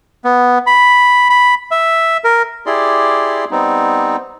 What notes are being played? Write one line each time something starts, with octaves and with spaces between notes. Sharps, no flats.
B3
B5
B5
E5
A#4
E4 G4 G#4 D5 C6
G3 B3 C4 D#4